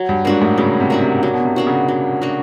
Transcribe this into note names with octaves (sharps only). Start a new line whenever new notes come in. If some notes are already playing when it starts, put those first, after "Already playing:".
Already playing: F#3
G2
G#2 A#3 D4 F#4
A2
C#3 F#3
C3
A#3 D4 F#4
C3
F#3
B2
C3
A#3 D4 F#4
C#3
F#3
A#3 D4 F#4